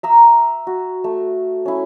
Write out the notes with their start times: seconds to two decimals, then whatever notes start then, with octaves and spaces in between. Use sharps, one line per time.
0.03 E5 A#5 E6
0.67 F#4
1.04 A3
1.66 C#4 E4